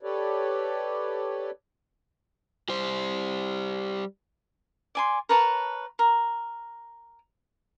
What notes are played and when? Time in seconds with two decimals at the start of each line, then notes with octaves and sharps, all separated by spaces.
0.03 G4 A4 B4 C#5 D5
2.69 G3 C5
4.95 D5 G#5 C6
5.29 A#4 B4 C#5 A5
5.99 A#4